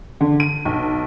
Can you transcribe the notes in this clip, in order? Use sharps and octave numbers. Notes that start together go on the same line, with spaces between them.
D3
D#7
B1